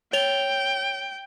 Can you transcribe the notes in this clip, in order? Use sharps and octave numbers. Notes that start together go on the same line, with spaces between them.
C#5 G5 F7 G7